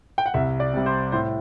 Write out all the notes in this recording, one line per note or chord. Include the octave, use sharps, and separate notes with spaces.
G5
F#5
C2 E5
D5
C3 G3
C5
A2 C5